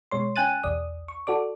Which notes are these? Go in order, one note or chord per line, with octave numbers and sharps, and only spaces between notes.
B2 G#3 C#5 C6
C#4 G5 G#5 F#6 A6 D#7
B1 E2 D5 D#6
C#6
F#4 A4 D5 D6